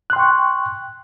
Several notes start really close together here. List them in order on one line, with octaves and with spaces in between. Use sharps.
F#6 C6 G5 C#6